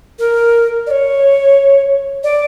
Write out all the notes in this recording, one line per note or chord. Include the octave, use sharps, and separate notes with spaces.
A#4
D5
C#5
D5